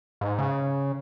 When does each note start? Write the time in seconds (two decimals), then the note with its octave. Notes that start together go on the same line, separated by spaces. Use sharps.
0.21 G#2
0.38 C#3